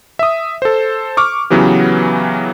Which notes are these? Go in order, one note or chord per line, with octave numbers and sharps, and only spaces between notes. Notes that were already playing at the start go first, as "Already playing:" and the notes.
E5 D#6
A4 C5
C#6 D6 F6
C#3 E3 F#3 B3 G4